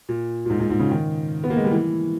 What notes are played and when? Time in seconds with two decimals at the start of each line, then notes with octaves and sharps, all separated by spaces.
0.09 A#2
0.45 A#2
0.50 G#2
0.60 G#2
0.70 G#2
0.79 C#3
0.91 D#3
1.44 B3
1.50 A#3
1.57 G#3
1.65 G3
1.71 E3